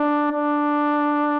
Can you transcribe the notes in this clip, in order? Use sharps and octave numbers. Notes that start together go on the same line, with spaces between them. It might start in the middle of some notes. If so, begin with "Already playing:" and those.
Already playing: D4
D4